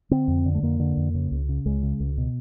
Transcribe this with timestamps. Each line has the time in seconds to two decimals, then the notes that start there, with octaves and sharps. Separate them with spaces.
0.11 D3 C4
0.28 F2
0.46 D3
0.55 A3
0.62 F2 A#3
0.80 D3
0.97 F2
1.14 C#3
1.31 C#2
1.49 C#3
1.66 C#2 G#3
1.83 C#3
2.00 C#2
2.18 B2